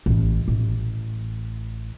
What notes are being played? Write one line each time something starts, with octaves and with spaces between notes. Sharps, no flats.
A1
A1